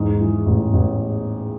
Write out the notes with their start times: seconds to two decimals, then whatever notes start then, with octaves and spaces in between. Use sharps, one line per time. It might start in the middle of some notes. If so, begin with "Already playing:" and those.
Already playing: E2 G#2
0.21 E3
0.46 A1
0.73 A1